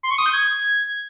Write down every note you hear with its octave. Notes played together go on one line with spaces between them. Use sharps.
C6
C#6
D#6
G6
G#6